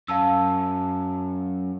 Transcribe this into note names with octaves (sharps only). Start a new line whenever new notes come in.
F#2 F5 A5 E6